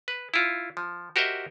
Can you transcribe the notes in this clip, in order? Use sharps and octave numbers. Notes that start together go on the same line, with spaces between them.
B4
E4 F4
F3
F#4 G4 A#4 C5 D#5 E5